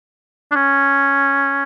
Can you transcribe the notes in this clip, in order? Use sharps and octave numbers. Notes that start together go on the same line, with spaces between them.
D4
C#4